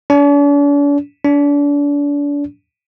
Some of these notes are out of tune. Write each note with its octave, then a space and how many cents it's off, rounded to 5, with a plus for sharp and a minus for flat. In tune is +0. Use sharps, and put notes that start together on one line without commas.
D4 -45
D4 -35